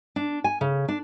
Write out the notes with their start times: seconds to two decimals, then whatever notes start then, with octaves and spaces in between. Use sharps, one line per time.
0.16 D4
0.44 G#5
0.61 C#3
0.88 D4